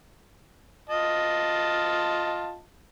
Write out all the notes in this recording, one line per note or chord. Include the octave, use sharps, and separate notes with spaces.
F4 D#5 A5